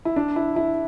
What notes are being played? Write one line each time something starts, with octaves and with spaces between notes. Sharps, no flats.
E4
D4
E4
E4